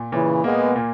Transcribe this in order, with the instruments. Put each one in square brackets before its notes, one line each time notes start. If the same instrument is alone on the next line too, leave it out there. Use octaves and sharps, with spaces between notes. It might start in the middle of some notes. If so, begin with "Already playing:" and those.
Already playing: [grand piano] A#2
[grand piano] A#2 [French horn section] C#3 E3
[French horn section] G#3 B3 [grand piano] A#3
[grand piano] A#2